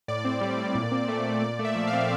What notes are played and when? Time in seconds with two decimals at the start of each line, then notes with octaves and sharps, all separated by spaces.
0.08 A2 D5
0.25 C4
0.41 G3
0.58 A2
0.75 A#2
0.92 C4
1.08 A3
1.26 A#2
1.42 A#2 D5
1.59 A3
1.65 E5
1.76 F3
1.87 F5
1.93 C4